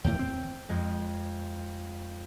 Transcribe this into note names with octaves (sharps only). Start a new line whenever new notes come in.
D#2 A2 G5
C4
F2 G#3